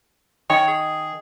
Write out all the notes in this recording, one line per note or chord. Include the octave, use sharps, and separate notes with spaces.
D#3 C#5
G#4